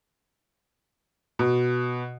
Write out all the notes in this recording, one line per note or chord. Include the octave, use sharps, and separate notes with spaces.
B2